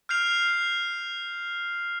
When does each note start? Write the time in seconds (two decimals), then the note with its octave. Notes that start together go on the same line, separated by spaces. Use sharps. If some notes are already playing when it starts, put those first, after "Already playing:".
0.09 F6 G6 C7 F7